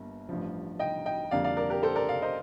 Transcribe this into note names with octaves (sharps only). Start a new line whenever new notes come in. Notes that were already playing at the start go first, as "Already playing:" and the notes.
Already playing: G1 G2 A#3
A1 G2 F3
D#5 G5
D#5 G5
F2 D3 G3 A#3 D5 F5
D5 F5
A#4 D5
G4 A#4
A4 C5
A#4 D5
D5 F5
C5 D#5